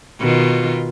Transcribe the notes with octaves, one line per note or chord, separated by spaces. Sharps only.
B2 D#3 F4